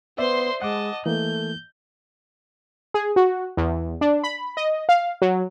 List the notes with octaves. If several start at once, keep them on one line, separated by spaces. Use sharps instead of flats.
B3 C5 D5 E5 C6
G#3 D#5 F#5 A5 D6
E3 A3 A#3 G6
G#4
F#4
E2
D4
B5
D#5
F5
F#3